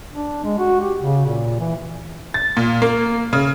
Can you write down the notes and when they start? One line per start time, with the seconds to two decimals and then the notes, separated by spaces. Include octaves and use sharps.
0.12 D4
0.44 G#3
0.59 F#4
0.81 G4
0.99 C#3
1.25 A#2
1.59 E3
2.34 A6
2.57 A#2
2.82 A#3
3.33 C#3